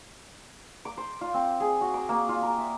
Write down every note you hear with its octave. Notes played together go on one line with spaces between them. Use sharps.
D6
C5
F4
C4
G#4
F#4
D6
A#3
F4
A#4
E5